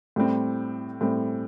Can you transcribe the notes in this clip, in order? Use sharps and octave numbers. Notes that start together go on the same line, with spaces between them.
A2 G3 C4
A2 G3 C4